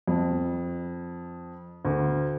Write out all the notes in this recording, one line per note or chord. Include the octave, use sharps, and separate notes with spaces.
F2
D2